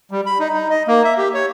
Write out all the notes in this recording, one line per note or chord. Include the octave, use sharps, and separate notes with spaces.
G3
B5
D#4
D#4
D#5
A#3
E5
G4
C#5